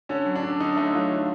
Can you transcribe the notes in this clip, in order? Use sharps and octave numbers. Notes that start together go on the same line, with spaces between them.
D3 C#4
F#3
D4
D3
D3 D#4
A3 D#4
F#3 F4
D3 F4